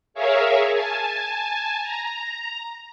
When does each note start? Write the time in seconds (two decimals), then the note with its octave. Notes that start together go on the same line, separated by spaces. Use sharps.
0.14 G#4 A#4 C#5 E5 F5
0.72 G#5 A5
1.81 A#5